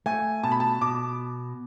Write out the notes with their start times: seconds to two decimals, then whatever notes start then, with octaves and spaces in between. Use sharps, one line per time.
0.06 A3 G#5
0.43 B2 A5
0.52 B5
0.60 A5
0.81 B2 D6